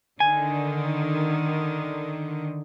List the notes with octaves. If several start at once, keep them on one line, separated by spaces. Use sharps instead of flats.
D3 D#3 G#5